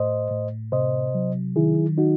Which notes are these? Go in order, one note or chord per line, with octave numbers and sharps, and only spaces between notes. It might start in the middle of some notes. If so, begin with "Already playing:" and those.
Already playing: A2 C5 D#5
A2
C3 C5 D#5
F#3
D#3 E4 G#4
D#4 F#4